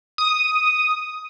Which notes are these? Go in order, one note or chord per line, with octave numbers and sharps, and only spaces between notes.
D#6